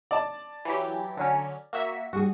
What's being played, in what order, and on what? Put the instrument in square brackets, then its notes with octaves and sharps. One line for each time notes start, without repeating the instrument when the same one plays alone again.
[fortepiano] D5 A5
[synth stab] E3 F#3 G4
D3 F#3 C#4
A#3 F#4 E5
[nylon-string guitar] G3 G#4 [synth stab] F#4